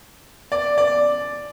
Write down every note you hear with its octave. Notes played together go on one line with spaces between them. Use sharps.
D5
D5